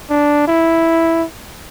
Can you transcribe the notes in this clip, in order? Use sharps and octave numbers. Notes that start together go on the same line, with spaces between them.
D4
E4